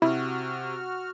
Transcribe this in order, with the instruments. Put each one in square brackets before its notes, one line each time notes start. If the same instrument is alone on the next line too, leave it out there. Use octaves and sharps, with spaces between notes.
[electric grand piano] C3 [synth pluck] E4 [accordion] F#4 F6